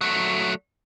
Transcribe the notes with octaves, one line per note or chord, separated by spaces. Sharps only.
F#3 A3